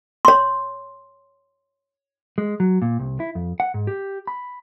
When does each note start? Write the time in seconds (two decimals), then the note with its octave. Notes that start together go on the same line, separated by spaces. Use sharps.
0.25 C#5 C6
2.38 G#3
2.60 F#3
2.82 A#2
2.99 C2
3.20 E4
3.35 F2
3.60 F#5
3.74 G#2
3.87 G4
4.27 B5